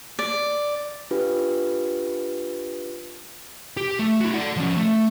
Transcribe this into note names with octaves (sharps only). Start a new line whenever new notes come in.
D5
D4 F4 G4 B4
G4
A3
E4 F#4
D5 F#5
F3 C#4
A3